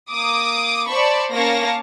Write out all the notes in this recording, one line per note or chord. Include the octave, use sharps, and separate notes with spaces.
A#3 D6 D#6
C5 D5 A5 B5 C#6
A#3 C#4 F5 A5 C#6 A#6